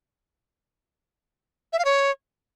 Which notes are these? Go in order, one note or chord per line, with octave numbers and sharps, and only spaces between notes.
E5
F5
C#5